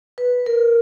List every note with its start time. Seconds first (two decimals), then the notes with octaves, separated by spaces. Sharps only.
0.18 B4
0.46 A#4